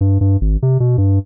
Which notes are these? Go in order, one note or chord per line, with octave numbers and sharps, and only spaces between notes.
G2
G2
G#1
C3
B2
G2